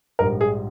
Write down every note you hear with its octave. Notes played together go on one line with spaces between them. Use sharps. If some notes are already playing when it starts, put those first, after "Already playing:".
A#1 G#2 G3 A#4
G#4